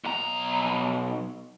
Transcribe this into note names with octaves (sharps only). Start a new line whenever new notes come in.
B1 A#5